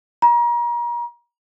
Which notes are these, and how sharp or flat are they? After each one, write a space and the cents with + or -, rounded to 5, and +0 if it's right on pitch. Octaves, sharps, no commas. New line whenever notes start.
A#5 +35